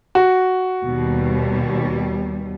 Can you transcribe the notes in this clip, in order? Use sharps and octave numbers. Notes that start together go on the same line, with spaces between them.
F#4
D#2 B2 G3